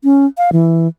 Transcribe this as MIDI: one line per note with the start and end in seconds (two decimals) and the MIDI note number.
0.04 0.26 61
0.38 0.50 77
0.53 0.88 52